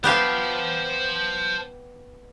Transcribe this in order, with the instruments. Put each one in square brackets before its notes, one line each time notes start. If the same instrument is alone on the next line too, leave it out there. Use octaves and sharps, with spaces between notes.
[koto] B3 G4 F5 [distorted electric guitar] C5 A5